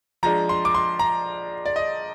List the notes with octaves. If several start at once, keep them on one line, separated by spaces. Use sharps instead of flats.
F3 G#3 D4 A#5
C6
D6
C6
A#5
D5
D#5